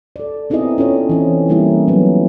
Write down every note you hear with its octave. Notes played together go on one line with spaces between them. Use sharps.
A4 D5
B3 C4 D#4 E4 G#4 D#5
C#4 F4 A4 C#5
E3 C4 C#5
E3 G3 A#3 C#4 D#4 E4
F#3 B3